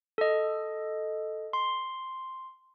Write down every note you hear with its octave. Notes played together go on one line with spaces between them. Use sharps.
A4 D#5
C6